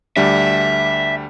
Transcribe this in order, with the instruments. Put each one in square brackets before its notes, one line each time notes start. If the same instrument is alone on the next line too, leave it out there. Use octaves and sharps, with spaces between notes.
[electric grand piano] D2 G3 D4 [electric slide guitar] E5